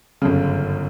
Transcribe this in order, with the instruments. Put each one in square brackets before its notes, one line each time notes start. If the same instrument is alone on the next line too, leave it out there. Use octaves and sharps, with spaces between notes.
[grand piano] G1 F#2 C#3